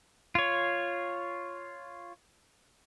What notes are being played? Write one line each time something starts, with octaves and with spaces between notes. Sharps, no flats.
F4 C#5